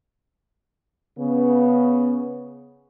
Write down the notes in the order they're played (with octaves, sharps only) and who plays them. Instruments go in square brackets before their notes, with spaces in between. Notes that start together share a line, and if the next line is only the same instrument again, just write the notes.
[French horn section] C#3 B3